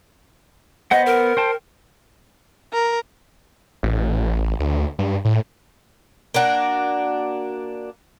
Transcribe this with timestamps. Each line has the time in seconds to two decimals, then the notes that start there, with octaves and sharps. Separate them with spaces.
0.91 B3 C5 D#5 F#5
1.06 A#4
1.37 C5 G5 A5
2.73 A#4
3.83 A1
4.60 D2
4.99 G2
5.25 A2
6.34 A#3 D4 F#4 A#4